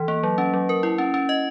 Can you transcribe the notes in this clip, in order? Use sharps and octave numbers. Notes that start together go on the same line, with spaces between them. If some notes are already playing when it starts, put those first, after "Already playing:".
Already playing: E3
A#3
F#3
C#4
F#3
A#4
E4
C#4
C#4
D#5